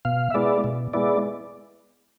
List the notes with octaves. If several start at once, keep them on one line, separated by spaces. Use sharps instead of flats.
B2 F5
E5
G#3 B3 E4 D5
B2
G#3 B3 E4 D5